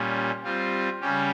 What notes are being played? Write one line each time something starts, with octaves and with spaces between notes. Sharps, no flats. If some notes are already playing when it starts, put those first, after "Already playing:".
Already playing: A#2 G3 C#4
G3 C4 F4
C#3 G3 C#4 G4